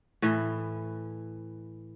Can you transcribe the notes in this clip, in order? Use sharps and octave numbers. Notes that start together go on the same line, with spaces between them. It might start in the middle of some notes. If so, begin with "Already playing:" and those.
A2 E3